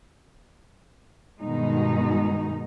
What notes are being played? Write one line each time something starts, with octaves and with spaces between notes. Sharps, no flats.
G2 B2 D#3 G#3 D#4